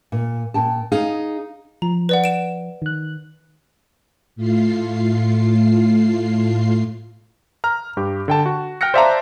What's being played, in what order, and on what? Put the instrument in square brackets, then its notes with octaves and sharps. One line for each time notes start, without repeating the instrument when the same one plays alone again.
[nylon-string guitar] A#2
A#2 G5 A5
D#4 G#4 F5
[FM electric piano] F3 [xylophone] A#5
[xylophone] B4 D5 F#5
D7 E7
[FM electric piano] D#3 F#6
[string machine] A2 A3 F4 C7
[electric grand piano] A#5 F6
G2 G4
D3 G5 A5
F#4
G5 F6 F#6 A#6 C#7
C5 D5 E5 F5 A5 A#5